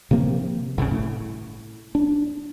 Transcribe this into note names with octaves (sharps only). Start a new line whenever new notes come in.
C3 F3 A#3 C4
G1 C2 A#2 C#3
A2
D4